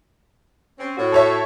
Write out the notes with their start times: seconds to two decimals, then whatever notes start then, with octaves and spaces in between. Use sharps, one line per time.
0.79 C4 C#4
0.98 A2 F#4
1.12 A4 C#5 E5